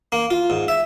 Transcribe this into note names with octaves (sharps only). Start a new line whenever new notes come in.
A#3
F4
G#2
E5